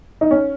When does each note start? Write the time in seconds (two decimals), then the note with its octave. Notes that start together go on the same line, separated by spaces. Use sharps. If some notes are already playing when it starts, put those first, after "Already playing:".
0.21 D#4
0.31 C#4